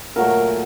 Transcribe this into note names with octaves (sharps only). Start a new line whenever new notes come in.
A#2 F#3 A3 A#4